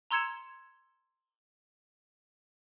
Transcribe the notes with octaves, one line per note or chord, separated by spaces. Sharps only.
A#5 C6 E6 G#6 C#7 E7